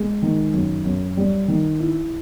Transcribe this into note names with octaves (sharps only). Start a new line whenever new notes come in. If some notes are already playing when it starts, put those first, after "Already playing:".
Already playing: G#3
D#3
F#2
F#2
G3
D#3
E4